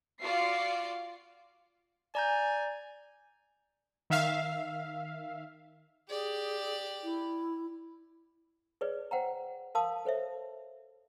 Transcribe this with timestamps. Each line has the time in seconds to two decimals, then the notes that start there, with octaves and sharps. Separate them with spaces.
0.21 F4 F#4 D5 C7
2.15 D5 G#5 A#5 G6
4.10 D#3 E5 F5
6.10 G4 G#4 D5
7.04 E4
8.81 G#4 B4 C#5 D5
9.11 C5 F#5 G5 A#5
9.75 A#4 F5 A5 C6 D#6
10.05 A4 C5 C#5 E5